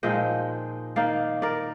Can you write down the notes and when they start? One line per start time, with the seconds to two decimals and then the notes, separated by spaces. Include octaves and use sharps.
0.03 A#2 F3 G#3 D#4 D#5 G5
0.96 D#3 A#3 D#4 D5 F5
1.42 A#4 D5